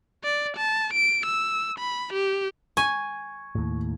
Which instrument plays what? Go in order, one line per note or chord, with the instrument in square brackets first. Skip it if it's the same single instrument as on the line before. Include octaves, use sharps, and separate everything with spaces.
[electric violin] D5
A5
D7
E6
B5
G4
[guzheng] G#5 [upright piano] C#6
[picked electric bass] D#2 A2